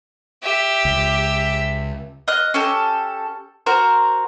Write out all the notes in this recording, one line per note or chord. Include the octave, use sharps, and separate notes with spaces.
G4 E5
C#2
D#5 F6 F#6
C#4 G4 A4
F#4 A#4 C5